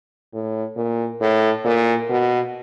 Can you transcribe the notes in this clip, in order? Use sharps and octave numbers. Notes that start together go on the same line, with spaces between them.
A2
A#2
A2
A#2
B2